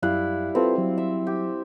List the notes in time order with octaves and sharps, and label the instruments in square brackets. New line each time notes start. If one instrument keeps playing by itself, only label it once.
[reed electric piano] F#2 F#6 [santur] G3 E4 F5
[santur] C4 [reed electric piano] F4 A4 B4
[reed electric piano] F#3
[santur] E5
G4